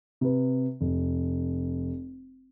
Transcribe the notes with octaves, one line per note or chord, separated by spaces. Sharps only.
C3 B4
F1